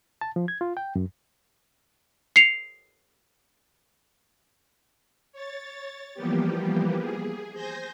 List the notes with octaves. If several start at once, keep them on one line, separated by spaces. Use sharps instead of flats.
A5
F3
G#6
F4
G5
F#2
C7 C#7 F7
C#5 A6
E3 F3 G3 A#3 B3 G4
G#4
C5 G#5 G6 A#6